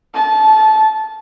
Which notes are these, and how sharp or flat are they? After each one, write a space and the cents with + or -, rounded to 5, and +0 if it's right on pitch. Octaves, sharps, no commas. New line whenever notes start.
A5 -20